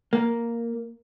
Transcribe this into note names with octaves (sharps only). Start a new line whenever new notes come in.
A#3